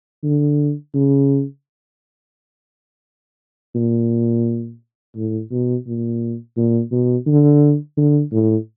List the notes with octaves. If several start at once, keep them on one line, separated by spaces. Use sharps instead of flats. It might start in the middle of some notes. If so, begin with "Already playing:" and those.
D3
C#3
A#2
A2
B2
A#2
A#2
B2
D3
D3
A2